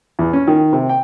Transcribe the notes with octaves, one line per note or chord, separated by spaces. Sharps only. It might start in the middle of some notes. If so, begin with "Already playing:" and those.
E2
C#4
D#3
C3
G5